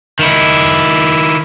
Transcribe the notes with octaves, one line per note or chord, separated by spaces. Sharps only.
D#3 E4